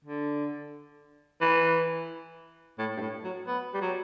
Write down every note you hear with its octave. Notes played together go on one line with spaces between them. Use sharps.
D3
E3
A2
G2
A2
F#3
B3
G3
F#3